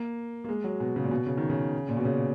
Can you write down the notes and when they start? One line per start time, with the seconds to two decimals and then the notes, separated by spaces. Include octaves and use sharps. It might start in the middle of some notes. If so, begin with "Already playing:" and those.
Already playing: A#3
0.44 A#3
0.49 G#3
0.64 F#3
0.80 B2
0.96 C#3
1.04 A#2
1.11 B2
1.26 C#3
1.37 D#3
1.50 C#3
1.88 A#2
1.97 B2
2.05 C#3